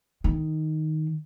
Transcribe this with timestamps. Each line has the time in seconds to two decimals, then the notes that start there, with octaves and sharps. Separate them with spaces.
0.24 D#3